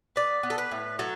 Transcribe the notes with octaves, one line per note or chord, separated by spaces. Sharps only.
B3 D5
B3
A4
B4
A2
F#3 A4